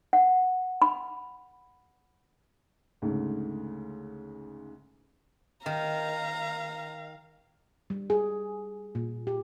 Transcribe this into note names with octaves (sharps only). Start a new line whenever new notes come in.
F#5
B5
D2 G#2 C#3
D#3 F5 A#5
G3
G#4
A#2
G4